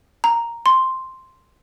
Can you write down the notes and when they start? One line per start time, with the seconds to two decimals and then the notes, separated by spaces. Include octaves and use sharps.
0.24 A#5
0.66 C6